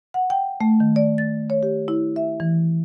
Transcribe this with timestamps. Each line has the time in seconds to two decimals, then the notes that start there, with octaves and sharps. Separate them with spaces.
0.14 F#5
0.30 G5
0.61 A3
0.80 D#3
0.96 D5
1.18 A6
1.50 C#5
1.63 G4
1.88 E4
2.16 E5
2.40 E3